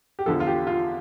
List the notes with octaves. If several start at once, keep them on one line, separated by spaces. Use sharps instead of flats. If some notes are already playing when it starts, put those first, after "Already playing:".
G4
E2 D3 F3 A4
F4
G4
F4